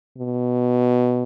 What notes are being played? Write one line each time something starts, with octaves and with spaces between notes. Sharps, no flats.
B2